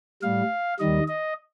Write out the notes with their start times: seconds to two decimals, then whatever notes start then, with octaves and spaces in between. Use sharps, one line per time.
0.22 A2 G3 F5
0.79 D#2 D#3 G3 D#5
1.08 D#5